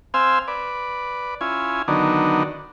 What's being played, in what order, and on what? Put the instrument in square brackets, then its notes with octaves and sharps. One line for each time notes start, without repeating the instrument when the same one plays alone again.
[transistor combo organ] C4 C5 F5 G#5 E6
B4 D5
C#4 E4 F4 G#5
D3 D#3 F#3 B3 D4 D#4